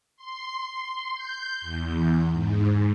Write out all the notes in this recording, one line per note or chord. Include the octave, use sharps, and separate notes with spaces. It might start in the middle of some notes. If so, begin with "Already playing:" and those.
C6
G6
E2
G#2